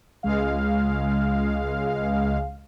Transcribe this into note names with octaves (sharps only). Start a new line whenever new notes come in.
C#2 G#3 F5